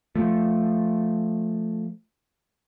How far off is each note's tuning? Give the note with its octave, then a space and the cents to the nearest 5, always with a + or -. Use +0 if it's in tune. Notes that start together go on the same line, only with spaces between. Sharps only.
F3 +0 A3 +0